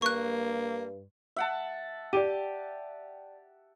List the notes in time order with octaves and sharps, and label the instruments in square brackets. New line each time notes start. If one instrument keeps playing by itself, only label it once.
[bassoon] G2 [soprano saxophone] A#3 [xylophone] C#6 F#6
[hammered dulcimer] E5 F#5 A5
[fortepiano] G4 [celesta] D5 G5 D#7